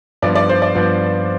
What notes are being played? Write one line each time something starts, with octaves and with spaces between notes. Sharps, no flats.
G2 F3 B3 D5
D5
C5
D5
G2 F3 B3